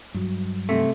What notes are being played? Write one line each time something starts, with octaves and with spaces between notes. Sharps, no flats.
G2 F#3
C3 A3